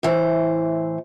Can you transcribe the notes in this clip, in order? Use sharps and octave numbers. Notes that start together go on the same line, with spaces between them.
A2 E3 C5